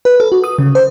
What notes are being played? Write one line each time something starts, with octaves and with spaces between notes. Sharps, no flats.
B4
A4
F#4
D#6
C#3
C5